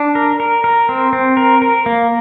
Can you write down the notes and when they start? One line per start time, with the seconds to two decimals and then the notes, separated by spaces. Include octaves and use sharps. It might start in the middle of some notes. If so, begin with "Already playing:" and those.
Already playing: D4
0.15 A#4
0.40 A#4
0.64 A#4
0.89 C4
1.13 C4
1.37 A#4
1.62 A#4
1.86 A#3